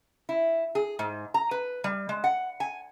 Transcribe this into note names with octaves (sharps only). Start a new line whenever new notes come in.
E4
G#4
G#2
A#5
B4
G3
G#3
F#5
G#5